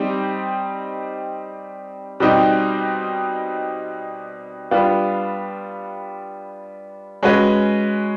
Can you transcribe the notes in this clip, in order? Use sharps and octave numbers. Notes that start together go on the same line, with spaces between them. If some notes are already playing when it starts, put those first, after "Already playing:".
Already playing: G3 C4 D#4 G4
B2 G3 C4 D#4 G4
G3 B3 D4 F4
G#3 C#4 F#4 B4